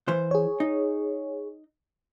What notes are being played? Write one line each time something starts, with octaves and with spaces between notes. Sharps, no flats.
E3 C5
G#4 C#5
D#4